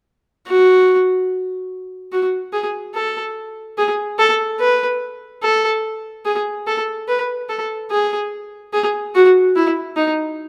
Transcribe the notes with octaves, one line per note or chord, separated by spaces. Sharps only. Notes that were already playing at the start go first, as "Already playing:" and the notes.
F#4
F#4
G#4
A4
G#4
A4
B4
A4
G#4
A4
B4
A4
G#4
G#4
F#4
E4
D#4